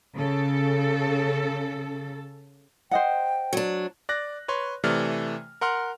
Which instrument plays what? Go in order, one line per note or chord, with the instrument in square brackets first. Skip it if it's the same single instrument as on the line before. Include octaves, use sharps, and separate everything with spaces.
[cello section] C#3 A4
[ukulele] C5 D#5 F#5 [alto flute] G5
[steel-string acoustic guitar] F#3 D4
[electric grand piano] D5 F#6 A#6
B4 C#5 C6
C3 E3 A3 D5 F6
A#4 F#5 C6 F6